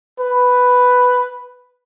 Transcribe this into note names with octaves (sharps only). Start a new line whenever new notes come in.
B4